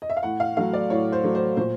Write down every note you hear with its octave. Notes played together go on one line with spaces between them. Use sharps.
D#5
E5
F5
A2 F#5
F5
F#3 A3 F5
D5
A2 C#5
C5
F#3 A3
C5
A#2 C5